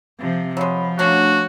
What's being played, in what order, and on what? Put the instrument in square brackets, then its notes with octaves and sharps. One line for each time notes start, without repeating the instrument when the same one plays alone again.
[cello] C3 F3
[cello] F3 [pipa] F#3 G#3 [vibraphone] C#5 B5
[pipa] F#3 A#3 C#4 [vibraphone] A3 D4 [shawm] F#4